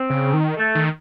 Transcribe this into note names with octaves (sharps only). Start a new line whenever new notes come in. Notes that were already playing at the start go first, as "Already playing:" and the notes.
Already playing: C4
C#3
D#3
A3
D#3